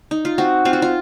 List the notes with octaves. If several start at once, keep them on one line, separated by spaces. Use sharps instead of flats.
D#4
F4
C4 F#4
C4 F4
F#4
F4